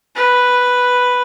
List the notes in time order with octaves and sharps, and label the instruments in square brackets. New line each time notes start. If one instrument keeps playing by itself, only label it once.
[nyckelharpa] B4